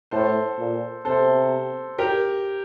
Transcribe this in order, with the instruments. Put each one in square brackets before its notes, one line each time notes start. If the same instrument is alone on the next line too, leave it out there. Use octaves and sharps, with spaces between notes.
[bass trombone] A2 [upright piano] A4 C5
[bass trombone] A#2
[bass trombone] C3 [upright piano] A4 C5
[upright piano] G4 A#4